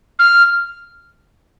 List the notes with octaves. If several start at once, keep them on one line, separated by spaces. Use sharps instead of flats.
F6